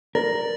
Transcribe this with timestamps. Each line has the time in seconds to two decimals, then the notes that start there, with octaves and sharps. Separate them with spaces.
0.15 A#4 D5